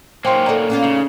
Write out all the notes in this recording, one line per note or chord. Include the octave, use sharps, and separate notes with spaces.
F#3 A#3 C#4 D#4 C5 G5 C6
D#4 F#4 A4 D5 A#5
A#3 B3 C#4 F4
C#3 D#4